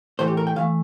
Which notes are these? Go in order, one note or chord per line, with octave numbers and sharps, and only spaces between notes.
A2 E3 A3 C5
G4
A#4
G5
A2 E3 A3 F5